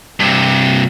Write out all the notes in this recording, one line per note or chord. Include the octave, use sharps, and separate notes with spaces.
G2 C3